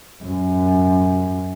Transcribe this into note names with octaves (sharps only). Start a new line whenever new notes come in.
F#2